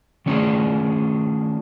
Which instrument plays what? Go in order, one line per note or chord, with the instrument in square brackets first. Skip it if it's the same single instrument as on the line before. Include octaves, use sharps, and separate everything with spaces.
[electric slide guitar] D#3 A3 C#4 D4 F4 G#4